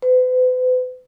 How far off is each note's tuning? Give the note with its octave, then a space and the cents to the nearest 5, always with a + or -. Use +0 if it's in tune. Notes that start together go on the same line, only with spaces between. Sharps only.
B4 +45